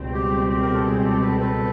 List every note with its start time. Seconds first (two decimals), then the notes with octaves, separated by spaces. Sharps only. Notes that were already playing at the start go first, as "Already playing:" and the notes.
Already playing: C#2 B2 G3 C4
0.13 G4
0.49 G4
0.62 A#4
0.74 A4
0.86 G#4
1.04 G4 A4
1.21 A4 B4
1.39 A4 B4